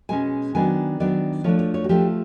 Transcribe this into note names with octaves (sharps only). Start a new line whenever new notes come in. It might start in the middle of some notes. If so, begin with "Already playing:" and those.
B2 G#3 C#4 G#5
D#3 F#3 B3 D4 G#5
D#3 F#3 B3 D4 D5
F3 A3 D4 C#5
C#5
C#5
F#4
F3 A3 D4 G4